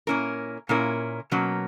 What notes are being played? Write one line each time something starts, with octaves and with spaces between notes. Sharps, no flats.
A#2 A#3 C#4 E4 A#4
A#2 A#3 C#4 E4 A#4
B2 F#3 A#3 C#4